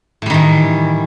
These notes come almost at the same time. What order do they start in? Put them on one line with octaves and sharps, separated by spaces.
A2 G3 D#3 E3